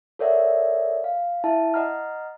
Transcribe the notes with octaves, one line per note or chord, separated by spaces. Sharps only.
A4 A#4 C#5 D5 E5 F#5
F5
E4 E5 A5
D#5 F#5 A#5 F6